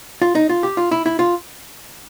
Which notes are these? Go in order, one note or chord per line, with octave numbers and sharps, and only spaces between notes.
F4
D#4
F4
G4
F4
E4
E4
F4